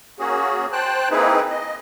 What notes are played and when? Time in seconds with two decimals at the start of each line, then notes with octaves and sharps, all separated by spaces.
0.19 A#3 C#4 F#4 G#4
0.72 C5 G5 A5 F#6
1.10 A#3 C4 D#4 E4 G#4 B4
1.50 D#5